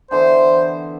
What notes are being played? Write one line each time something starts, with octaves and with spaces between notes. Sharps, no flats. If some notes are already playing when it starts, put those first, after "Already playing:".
D3 E3 B3 C5